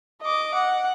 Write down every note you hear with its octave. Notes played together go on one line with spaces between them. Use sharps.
D#5 D6
F#5